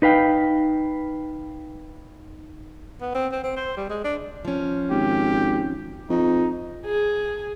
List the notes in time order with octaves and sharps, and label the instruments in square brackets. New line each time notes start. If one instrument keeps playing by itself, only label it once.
[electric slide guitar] D#4 B4 F5 G5
[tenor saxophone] B3
C4
C4
C4
C5
G3
G#3
D4
[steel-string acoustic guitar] F3 C#4
[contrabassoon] G#1 [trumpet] G4
[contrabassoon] F2 [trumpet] D#4
[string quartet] G#4